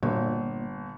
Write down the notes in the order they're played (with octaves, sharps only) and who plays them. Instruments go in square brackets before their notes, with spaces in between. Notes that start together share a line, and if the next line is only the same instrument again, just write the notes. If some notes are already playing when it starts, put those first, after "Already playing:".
[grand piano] G1 [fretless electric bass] A#2